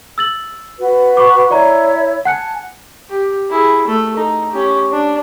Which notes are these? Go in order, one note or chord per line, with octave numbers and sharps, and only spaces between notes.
E6 A6 F#7
F#4 B4
C#6 D6
E4 C#5 D5 E5 A#5
F#5 G#5 A5 F#6 C#7
G4
E4 G#4
A3 A4
D#4
C#4 G4
D4